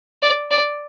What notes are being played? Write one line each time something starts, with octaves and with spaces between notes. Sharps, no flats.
D5
D5